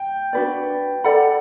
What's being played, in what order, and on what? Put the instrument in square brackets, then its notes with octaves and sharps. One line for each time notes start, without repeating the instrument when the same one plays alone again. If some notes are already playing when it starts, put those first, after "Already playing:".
Already playing: [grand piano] G5
[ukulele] D4 F#4 B4 D5
A4 D5 F#5 B5